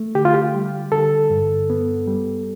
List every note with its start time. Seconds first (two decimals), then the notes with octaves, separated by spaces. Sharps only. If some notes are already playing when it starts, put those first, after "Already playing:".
Already playing: A3
0.15 D3 G4
0.25 F4
0.34 G4
0.54 G3
0.92 D3 A4
1.30 G2
1.70 B3
2.08 G3